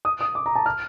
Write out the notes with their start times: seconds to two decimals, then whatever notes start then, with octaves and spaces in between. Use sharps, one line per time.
0.05 D#6
0.21 D#6
0.35 D6
0.46 A#5
0.56 A5
0.66 F6